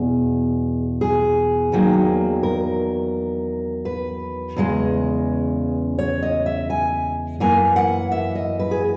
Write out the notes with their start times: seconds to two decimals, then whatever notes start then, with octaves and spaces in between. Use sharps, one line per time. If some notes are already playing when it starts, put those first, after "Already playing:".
Already playing: E2 B2 G#4
1.01 G#4
1.72 E2 D#3 F#3 A#3
2.43 A#4
3.85 B4
4.56 E2 C#3 G#3
5.99 C#5
6.23 D#5
6.46 E5
6.70 G#5
7.40 F#2 E3 A#3 G#5
7.76 F#5
8.11 E5
8.35 D#5
8.59 B4
8.71 G#4